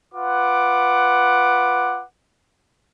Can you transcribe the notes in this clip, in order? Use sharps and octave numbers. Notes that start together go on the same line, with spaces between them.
F4 B4 F#5 D6